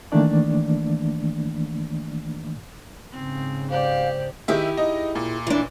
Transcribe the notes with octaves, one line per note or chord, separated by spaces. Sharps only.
D#3 E3 A3 A#3 D4 D5
G#2 C#3 C4
G4 C5 D5 F5
D#3 E4 G4 G#4 E5
D#4 D#5
A#2
E3 D4